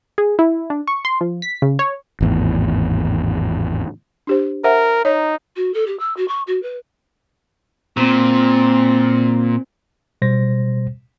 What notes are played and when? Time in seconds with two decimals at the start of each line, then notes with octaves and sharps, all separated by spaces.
0.18 G#4
0.39 E4
0.70 D4
0.88 C#6
1.05 C6
1.21 F3
1.42 B6
1.62 C#3
1.79 C#5
2.21 G#1 E2 A2
4.27 D4 G4 C5
4.64 A#4 C5 E5 F#5
5.05 D#4 C#5 A#5
5.56 F#4
5.73 A4
5.86 G4
5.99 E6
6.16 F#4
6.28 C#6
6.47 F#4
6.62 B4
7.97 A#2 C4
10.22 B2 G3 C5 A#6